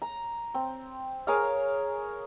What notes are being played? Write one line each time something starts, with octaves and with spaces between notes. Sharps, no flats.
A#5
C4
G#4 A#4 C#5 F5